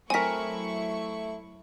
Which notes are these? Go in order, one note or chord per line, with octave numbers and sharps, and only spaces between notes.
F#3 A3 C4 E4 A#4 G#5 C#6 B6